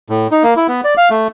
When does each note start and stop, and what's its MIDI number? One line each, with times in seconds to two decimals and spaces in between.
0.10 0.27 45
0.31 0.43 63
0.43 0.54 58
0.56 0.67 64
0.68 0.81 59
0.84 0.94 74
0.97 1.09 77
1.10 1.28 57